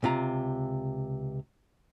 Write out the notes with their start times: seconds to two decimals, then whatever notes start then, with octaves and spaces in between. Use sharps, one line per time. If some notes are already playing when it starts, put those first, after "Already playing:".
0.03 C#2 C3 F4 A#5